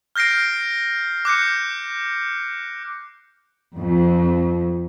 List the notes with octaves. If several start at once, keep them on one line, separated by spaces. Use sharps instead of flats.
F6 G6 A#6 C7 D7
D6 F#6 G6 C#7
F2